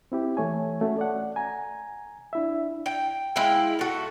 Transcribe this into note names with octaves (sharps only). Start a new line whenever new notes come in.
C4 E4 G4
E3 A3 C#5 G#5
A3 C#4 F#4
D5 F#5
G#5 A#5
D4 E4 E5
G5
G#3 E4 F5 G5
A3 F#4